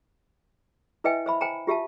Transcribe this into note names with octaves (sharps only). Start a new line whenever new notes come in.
E4 B4 D#5 E5 G5 G#5
C5 E5 B5
C5 G5 G#5 A#5
F4 G4 E5 F5 A5